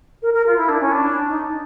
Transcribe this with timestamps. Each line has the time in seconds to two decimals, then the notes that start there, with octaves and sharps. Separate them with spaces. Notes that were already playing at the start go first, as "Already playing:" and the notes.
0.22 A#4
0.33 A#4
0.45 F4
0.57 E4
0.68 D4
0.80 C#4
0.91 D4
1.28 D#4